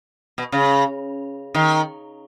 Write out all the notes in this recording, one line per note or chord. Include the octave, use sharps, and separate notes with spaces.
B2
C#3
D#3